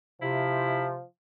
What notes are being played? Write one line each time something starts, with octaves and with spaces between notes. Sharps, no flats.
C3 F3 E4